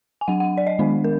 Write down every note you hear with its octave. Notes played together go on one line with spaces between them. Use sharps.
G#5
F#3 D4 F#5
F#5
D5
D#5
D#3 G#3 B3 D4
A#4